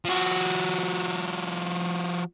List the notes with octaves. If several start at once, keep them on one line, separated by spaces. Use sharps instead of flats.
F3 F#4